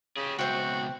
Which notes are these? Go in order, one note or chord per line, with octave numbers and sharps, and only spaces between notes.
C#3 G4 G#4
C#2 B2 F#4 C5 E5 G5